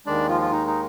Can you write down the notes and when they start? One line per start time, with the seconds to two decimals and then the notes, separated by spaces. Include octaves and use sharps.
0.06 D#2 D#3 G#3 D4 D5
0.29 F3 F4
0.41 F4
0.52 D#4
0.67 D#4